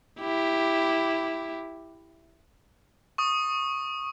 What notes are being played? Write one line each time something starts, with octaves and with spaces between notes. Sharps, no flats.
E4 G4
C#6 D#6